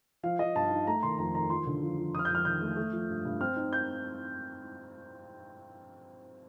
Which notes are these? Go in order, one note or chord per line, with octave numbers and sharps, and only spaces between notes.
F3 F5
F3 D#5
G2 A5
D#4
A3 A#5
D#3 C6
F2 A#5
D#3 A#5
F3 C6
D3
F3
F3
F2 D#6
F6
G6
F2 F6
D#3 G6
A3
A3
F3
G2
G2
C4 F6
D#4
G6